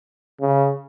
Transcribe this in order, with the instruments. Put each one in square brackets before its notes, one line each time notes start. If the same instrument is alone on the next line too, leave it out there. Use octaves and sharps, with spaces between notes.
[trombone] C#3